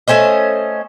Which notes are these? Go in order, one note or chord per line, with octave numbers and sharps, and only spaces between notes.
A3 C#4 C5 D#5